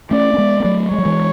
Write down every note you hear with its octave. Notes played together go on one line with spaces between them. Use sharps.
A3 C#4 D5
C#4
G#3 B3
B3
F#3 A3
G#3 C#5
F#3
E3 G#3